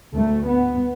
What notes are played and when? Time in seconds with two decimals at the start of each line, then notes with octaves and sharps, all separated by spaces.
0.14 D2 A3
0.46 B3